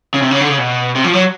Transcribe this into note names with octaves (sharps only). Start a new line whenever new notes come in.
C#3
C3
C#3
D3
C#3
B2
C3
F3
F#3